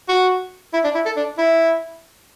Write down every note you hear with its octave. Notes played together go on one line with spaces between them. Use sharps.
F#4
E4
D4
E4
A4
D4
E4